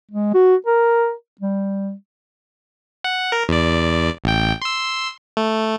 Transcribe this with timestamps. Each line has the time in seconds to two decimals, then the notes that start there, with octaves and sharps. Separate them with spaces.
0.11 G#3
0.34 F#4
0.66 A#4
1.41 G3
3.04 F#5
3.32 A#4
3.49 E2 D5
4.24 A1 G5
4.62 C6 E6
5.37 A3